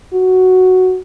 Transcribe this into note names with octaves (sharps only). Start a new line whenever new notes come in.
F#4